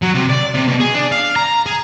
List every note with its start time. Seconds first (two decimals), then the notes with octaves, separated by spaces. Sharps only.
0.03 F#3
0.15 C3
0.30 D5
0.54 C3
0.68 B2
0.80 G#4
0.94 D4
1.12 F5
1.36 A#5
1.66 G#4